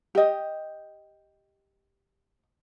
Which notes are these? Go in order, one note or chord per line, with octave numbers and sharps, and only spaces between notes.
G4 D#5